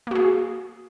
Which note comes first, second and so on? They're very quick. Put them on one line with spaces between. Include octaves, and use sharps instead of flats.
A#3 F#4 G#4